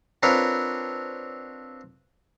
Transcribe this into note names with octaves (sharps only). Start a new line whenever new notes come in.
C4 D4 F4 A#4 B4 C#5